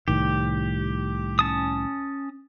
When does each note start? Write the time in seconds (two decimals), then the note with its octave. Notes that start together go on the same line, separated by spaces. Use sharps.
0.08 C2 A2 D#3 G4
1.39 C#4 A5 D#6